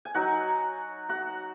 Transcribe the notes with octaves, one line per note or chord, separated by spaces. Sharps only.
G#5
F#3 D#4 F#4 F#5
F#4 F#5